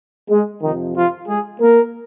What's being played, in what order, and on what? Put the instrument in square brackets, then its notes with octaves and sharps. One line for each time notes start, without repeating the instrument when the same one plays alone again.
[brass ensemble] G#3
F2 C3 D#3 F3 D#4
F3 F4
G#3 G#4
A#3 A#4